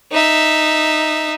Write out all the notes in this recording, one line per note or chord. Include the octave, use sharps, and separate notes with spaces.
D#4 E5